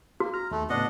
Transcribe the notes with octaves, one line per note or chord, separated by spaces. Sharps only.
A#3 F#4
A#5 F6
D#2 A3
A2 C#3 B3 D4 D#5 F#5